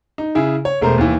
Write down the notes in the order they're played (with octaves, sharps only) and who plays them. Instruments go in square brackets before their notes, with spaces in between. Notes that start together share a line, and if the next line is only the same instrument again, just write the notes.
[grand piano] D#4
C#3 E4 G#4
C#5
E1 A3 A#4 C5
D#2 E3